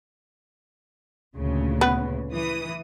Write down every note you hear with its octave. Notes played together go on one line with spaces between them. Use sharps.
D2 A#2 C#3
B3 B4
E3 D#6